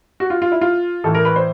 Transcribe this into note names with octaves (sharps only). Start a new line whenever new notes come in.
F#4
F4
F4
E4
F4
A2 E3 A4
A#4
B4
C5